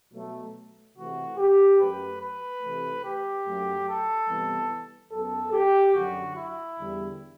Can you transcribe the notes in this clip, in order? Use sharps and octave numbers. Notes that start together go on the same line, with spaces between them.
B2 F#3 A3
C3 E3 A3 F#4
G4
F#2 F#3 A3 B4
B4
C3 E3 A3
G4
F#2 F#3 A3
A4
C3 E3 G3 B3
F#2 F#3 B3 A4
G4
F#2 D3 F#3 F#4
E4
E2 D3 G3